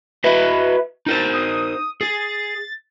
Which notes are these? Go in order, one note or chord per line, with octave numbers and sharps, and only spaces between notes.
F#4 B4 D#5 E5
D#4 A#4 C5 A6
D#6
G#4 A6